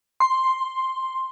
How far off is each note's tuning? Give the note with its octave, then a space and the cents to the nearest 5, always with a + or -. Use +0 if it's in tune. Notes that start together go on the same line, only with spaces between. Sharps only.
C6 +5